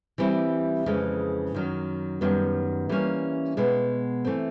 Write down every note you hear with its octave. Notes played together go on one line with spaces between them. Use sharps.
E3 G3 C4 E4 G4
F2 C#3 E3 G#3
F#2 D#3 F#3
F#2 D#3 G3 B3
E3 G3 A#3 C#4
B2 G#3 B3
E3 A3 C4